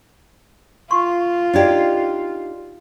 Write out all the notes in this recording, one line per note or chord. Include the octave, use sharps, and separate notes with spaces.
F4 C6 C#6
D4 D#4 G4 D5 D#5